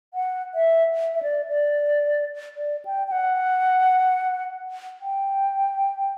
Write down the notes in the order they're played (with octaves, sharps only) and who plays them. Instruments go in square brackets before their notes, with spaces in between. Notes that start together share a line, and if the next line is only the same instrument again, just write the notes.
[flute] F#5
E5
E5
D5
D5
D5
G5
G5
F#5
G5